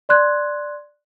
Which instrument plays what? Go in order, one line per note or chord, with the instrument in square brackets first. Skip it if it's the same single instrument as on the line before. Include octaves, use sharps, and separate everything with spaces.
[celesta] D5 C6 F#6 G#6